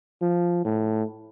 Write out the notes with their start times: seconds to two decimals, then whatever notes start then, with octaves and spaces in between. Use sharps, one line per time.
0.22 F3
0.65 A2